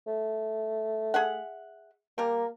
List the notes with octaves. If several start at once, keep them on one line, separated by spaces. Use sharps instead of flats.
A3
G#4 E5 F#5
G3 A#3 A#4